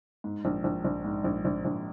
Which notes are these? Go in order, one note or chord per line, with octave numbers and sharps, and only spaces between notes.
G#2
A#1
A#1
A#1
G#2
A#1
A#1
A#1